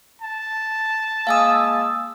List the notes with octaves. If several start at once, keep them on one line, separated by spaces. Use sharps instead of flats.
A5
G#3 A#3 F5 G#5 D#6 E6